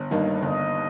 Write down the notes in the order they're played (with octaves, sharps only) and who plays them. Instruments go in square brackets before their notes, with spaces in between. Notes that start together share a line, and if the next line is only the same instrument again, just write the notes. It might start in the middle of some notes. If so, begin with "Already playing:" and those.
Already playing: [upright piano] G1
G2 D#3 A#3 D#4
[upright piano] G1 [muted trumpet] D#5